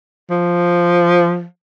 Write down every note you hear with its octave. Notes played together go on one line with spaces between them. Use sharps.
F3